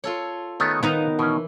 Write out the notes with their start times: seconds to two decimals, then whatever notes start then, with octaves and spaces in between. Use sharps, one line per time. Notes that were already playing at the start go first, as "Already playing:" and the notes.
0.04 F4 A4 C#5
0.60 D#3 A3 B3 C#5 D#5
0.83 D#3 B3 D#4 B4 C5 F5 A#5
1.19 B2 E3 C#4